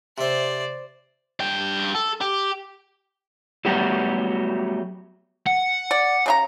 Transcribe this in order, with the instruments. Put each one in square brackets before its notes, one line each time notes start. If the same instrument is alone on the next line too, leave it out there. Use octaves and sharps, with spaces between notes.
[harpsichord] C3 E5 [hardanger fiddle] C5 D5
[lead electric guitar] G2 G5
A4
G4
[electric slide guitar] F#3 G3 A3 B3 F#4 G4
[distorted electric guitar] F#5
[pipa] D5
C#3 D#4 A#5